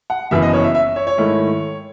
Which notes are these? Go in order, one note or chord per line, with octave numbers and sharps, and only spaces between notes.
F#5
F#1 F#2 E3 B3 E5
D#5
C#5
E5
E5
C#5
C#5
G#2 D#3 A3 E4